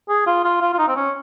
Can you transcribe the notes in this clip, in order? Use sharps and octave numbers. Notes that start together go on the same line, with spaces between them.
G#4
F4
F4
F4
F4
D#4
C4
C#4